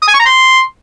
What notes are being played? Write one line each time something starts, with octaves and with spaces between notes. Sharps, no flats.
D#6
G#5
C#6
A#5
C6